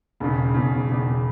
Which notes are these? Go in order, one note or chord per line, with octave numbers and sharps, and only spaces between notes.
E1 E2 C#3
E1 E2 C#3
E1 E2 C#3